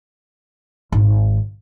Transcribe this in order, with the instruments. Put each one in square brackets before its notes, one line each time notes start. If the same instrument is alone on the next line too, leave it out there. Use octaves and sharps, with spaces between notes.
[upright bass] G#1